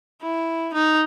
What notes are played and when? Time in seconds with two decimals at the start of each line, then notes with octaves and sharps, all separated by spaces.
0.22 E4
0.74 D#4